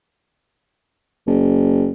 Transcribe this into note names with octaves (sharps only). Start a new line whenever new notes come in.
F#1